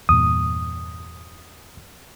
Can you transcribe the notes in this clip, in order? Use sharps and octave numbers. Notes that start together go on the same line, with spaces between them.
E2 G2 A#2 D#6